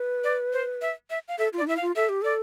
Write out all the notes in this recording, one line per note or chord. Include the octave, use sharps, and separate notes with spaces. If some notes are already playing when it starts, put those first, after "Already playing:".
Already playing: B4
D5
C5
E5
E5
F5
A4 E5
F4 D5
D4
E4 E5
F5
F4
A4 E5
G4
A4 D5